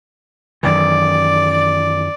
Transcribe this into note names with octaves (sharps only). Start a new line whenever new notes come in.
F#2 D#3 E3 D5